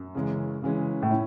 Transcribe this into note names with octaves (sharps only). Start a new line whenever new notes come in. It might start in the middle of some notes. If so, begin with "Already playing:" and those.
Already playing: F#2
C#3 E3 G#3 C#4
C#3 E3 G#3 C#4
A2
C#4 E4